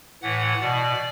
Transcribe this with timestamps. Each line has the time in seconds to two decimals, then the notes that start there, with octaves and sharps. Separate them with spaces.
0.22 A2 E3 F#5
0.61 B2 D5